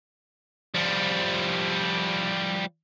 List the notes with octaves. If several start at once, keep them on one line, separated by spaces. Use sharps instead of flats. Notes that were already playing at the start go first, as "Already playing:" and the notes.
F3 G3